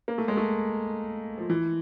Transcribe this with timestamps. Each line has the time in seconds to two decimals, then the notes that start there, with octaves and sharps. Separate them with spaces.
0.08 A#3
0.18 A3
0.28 G#3
0.37 A3
1.38 F3
1.50 E3